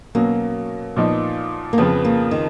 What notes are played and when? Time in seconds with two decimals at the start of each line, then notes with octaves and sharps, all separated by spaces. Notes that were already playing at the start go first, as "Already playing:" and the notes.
0.15 B2 F#3 A#3 C#4
0.96 A#2 F3 B3 D#4
1.73 A#3
1.78 F2 C#3 F3 B3
2.05 A#3
2.31 D#3